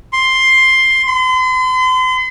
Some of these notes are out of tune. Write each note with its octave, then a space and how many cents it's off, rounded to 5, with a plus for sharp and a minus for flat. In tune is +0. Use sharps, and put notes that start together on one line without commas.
C6 +10
C6 -40